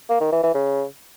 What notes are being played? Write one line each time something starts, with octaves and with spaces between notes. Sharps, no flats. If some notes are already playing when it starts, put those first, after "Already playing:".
A#3
D#3
E3
E3
C#3